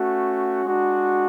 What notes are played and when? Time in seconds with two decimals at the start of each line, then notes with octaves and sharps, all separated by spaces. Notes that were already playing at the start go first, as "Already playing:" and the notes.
Already playing: A3 C#4 F#4
0.65 G#3 D4 F#4